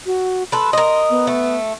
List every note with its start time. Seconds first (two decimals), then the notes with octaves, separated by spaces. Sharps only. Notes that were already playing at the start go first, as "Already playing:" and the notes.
0.06 F#4
0.52 A4 B4 C6
0.73 A#4 D#5
1.10 B3
1.27 A3